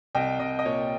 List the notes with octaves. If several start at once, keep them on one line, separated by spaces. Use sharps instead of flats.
C2 D#5 G5
C2 D#5
D#5
A#2 C#5